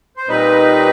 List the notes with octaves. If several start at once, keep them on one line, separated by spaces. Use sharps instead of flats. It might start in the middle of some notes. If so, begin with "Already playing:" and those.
C5
A#2 G3 C4 D#4 B4